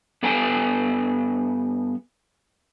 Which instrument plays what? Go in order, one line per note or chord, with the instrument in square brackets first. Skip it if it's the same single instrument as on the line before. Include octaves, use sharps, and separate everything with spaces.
[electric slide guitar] G2 B3 A4 G5 G#5